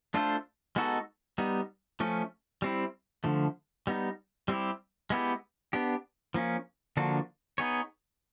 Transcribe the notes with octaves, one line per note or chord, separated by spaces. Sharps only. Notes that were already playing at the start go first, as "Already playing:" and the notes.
A3 D4 F4 A4 C5
G#3 B3 D#4 F#4 A4
G3 B3 D#4
F3 A3 C#4
G3 C4 E4
D3 F3 A3
G3 B3 D#4
G3 C4 E4 G4
G#3 B3 E4 G4
B3 D4 G4
F3 A#3 C#4
D3 F3 A#3 D4 F#4
B3 D#4 G#4 C#5